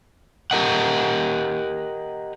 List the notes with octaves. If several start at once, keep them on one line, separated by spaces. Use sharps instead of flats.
G4 A#4 D#5 F#5